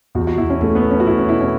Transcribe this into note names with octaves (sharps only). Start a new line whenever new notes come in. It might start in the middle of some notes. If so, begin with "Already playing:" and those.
E2 F#4
F#4
E2 E4
C#4
E2 A3
B3
E2
C#4
F#4
E2 E4
C#4
B2 E4
C#4